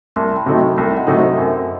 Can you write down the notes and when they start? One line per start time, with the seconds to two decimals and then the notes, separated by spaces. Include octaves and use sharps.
0.16 C2 A5 C6
0.36 G5 B5
0.46 C3 F#3 A3 D#4
0.77 C2 E5 G5
0.97 D#5 F#5
1.07 C3 F#3 A3 D#4 D#5
1.17 C5 E5
1.37 F#2